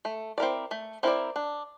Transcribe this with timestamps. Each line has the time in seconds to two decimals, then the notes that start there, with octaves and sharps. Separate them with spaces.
0.05 A3
0.38 C4 E4 A#4 D5
0.71 A3
1.03 C4 E4 A#4 D5
1.36 D4